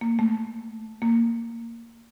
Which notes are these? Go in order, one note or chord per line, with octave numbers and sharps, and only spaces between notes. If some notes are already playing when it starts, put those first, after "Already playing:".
A#3
A3
A#3